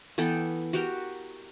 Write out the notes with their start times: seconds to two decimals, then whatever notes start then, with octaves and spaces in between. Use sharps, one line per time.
0.18 E3 B3 A4 G5
0.73 F#4 G4 A#4